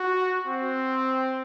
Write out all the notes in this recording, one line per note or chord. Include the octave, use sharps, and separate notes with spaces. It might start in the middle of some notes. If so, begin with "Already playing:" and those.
Already playing: F#4
C4